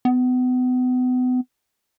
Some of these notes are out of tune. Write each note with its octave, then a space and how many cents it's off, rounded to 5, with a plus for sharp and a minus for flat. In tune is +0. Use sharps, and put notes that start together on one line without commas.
B3 +35